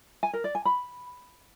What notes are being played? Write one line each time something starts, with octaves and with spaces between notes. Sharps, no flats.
G#5
A#4
D5
G#5
B5